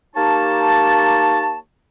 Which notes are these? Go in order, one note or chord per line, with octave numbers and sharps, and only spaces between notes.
A#3 D#4 G4 C#5 A5